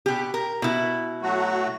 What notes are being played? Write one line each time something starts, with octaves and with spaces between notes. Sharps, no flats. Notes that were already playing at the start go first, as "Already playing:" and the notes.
B2 G4
A#4
B2 E4
F#3 A3 F#4